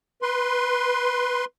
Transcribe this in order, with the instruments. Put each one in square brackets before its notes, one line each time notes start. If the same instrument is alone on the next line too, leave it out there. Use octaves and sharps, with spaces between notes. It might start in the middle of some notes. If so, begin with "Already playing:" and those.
[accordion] B4 C6